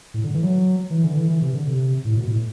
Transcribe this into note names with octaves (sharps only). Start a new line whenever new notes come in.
A2
D3
E3
F#3
E3
D3
E3
E3
C3
D3
C3
A2
B2
A2